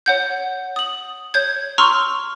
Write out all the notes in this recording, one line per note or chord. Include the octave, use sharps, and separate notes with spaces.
C#5 F#5 G6
D#6 F#7
C#5 G6 G#6
A#5 C6 C#6 E6 F6